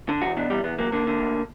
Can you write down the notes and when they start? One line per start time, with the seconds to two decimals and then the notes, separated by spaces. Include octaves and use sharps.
0.09 D3
0.22 E2 F#4
0.37 B2 D4
0.50 E2 G3
0.64 E2 B3
0.78 F#3 A#3
0.92 D3 A#3
1.07 D3
1.20 D2